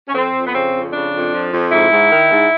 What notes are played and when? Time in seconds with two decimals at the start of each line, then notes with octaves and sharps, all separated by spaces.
0.09 C#4
0.15 F2 C4
0.34 F2
0.47 B3
0.54 C#3 C4
0.74 F2
0.93 C#3 D4
1.13 F2
1.32 F3
1.53 F2
1.72 G#2 E4
1.91 G#2
2.12 D#3
2.32 G#2